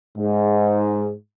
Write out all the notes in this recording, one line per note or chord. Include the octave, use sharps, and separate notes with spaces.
G#2